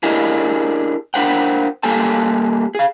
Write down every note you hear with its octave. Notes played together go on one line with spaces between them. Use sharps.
D4 E4 G4 G#4 A#4 D#5
D4 A#4 C5 F#5 G5
G3 A#3 G4 A4 G#5 A5
G#4 F5